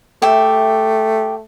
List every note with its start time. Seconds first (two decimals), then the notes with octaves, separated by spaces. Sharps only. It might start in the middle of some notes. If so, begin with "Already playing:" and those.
0.22 A3 G4 E5